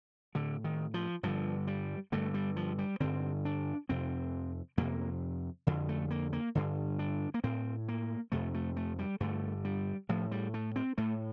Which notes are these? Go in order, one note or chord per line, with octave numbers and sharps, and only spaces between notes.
A2 D3
D#3
F3
G2 D3 F3
G3
G2 D3 A3
G3
F3
G3
G2 D3 C4
D4
F2 C3 C4
F2 C3 A#3
F2 D3
A3
A#3
A#3
G2 D3
D4
A#3
A2 C4
A#3
F2 C3 A3
A3
A3
G3
G2 D3 A3
G3
A2 F3
G3
A3
C4
A2 A3